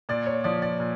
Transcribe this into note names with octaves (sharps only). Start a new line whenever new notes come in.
A#2 D5
C#5
F3 D5
D5
A#2